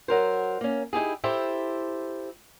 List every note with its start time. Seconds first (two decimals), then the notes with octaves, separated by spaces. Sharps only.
0.08 F#3 A#4 C5
0.61 A#3 C#4
0.93 D#4 E4 G4 G#4
1.24 E4 G4 A4 C5 E5